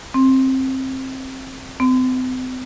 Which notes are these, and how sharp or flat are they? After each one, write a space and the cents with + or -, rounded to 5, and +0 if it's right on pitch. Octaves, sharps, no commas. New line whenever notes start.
C4 +15
C4 -40